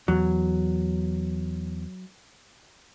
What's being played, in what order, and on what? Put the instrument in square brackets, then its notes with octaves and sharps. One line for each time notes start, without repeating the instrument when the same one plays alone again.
[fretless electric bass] E2 [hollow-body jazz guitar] F#3